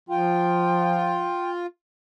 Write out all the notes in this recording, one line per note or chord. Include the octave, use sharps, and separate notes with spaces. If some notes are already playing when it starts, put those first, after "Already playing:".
F3 F4 G5